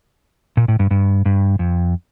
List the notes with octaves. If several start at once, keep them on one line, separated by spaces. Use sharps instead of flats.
A#2
A2
G2
G2
G2
F2